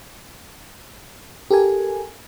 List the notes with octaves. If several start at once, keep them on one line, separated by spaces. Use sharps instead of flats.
G4 A4 A#4 G#5